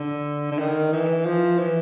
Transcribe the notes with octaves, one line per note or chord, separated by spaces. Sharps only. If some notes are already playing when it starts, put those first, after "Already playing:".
Already playing: D3
D3
D#3
E3
F3
E3